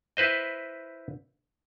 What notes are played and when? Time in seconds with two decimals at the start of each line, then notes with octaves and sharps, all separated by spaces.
0.17 E4 B4 C5 D#5